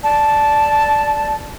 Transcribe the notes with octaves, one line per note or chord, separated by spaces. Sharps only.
D5 A5